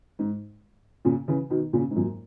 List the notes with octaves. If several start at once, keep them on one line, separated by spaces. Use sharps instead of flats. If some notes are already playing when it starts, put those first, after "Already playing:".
G#2
A#2 C#3
C#3 E3
B2 D#3
A#2 C#3
G#2
F#2 A#2